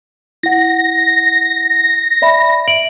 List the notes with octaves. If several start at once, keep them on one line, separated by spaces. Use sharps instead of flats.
E4 F#5 A#6
D5 E5 B5
E5 D7 F#7